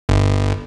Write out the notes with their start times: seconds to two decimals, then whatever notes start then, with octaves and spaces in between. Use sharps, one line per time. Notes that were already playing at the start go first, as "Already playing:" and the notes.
0.09 G1